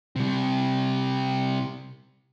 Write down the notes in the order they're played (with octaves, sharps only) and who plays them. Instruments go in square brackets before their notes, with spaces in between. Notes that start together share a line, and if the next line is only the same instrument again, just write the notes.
[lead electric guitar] C3 G3